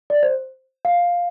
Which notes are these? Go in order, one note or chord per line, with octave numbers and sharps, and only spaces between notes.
D5
C5
F5